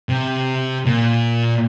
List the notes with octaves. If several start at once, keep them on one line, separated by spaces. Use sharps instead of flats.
C3
A#2